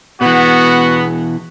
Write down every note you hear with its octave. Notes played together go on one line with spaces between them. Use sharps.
B2 E3 B3 F#4